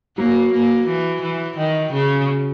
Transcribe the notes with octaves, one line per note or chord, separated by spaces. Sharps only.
F#3 A#3
A#3
E3
E3
D#3
C#3